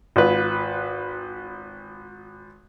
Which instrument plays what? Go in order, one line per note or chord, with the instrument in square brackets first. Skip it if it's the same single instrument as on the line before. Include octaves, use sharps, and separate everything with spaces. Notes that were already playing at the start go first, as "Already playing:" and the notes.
[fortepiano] G#1 F4 B4